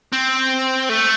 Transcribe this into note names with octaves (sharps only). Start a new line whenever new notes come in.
C4
A3